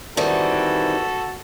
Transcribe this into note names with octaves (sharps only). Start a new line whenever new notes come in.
D#3 E3 G3 C4 F#4 A4